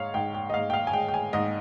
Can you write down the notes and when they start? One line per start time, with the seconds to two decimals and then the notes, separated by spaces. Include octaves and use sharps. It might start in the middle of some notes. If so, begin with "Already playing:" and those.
Already playing: G#2 C#5 F5
0.14 G#2 G5
0.34 G5
0.50 D#5
0.54 G#2 F5
0.70 G5
0.74 F5
0.87 G#5
0.93 G#3 G5
1.08 G5
1.14 G#5
1.33 G#2 D#5